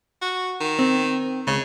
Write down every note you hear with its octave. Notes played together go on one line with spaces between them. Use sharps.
F#4
D#3
C4
C#2 C#3